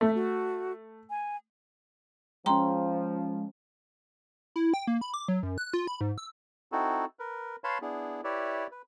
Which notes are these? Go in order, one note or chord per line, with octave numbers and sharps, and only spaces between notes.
A3 E5
F#4
G#5
F3 G#3 C#4 G5 A#5 C6
E4
G5
A#3
B5
D6
F#3
F#2
F#6
F4
B5
G#2
E6
C4 D#4 E4 F#4 A4
A#4 B4
B4 C#5 F5 A5 B5 C6
B3 D4 E4 G#4
E4 G4 B4 C#5 D5 E5
B4